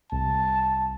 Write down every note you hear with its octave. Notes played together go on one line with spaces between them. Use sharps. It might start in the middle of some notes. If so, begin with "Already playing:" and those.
C2 A5